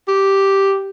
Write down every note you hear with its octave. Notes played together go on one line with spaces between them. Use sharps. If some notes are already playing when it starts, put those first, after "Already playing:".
G4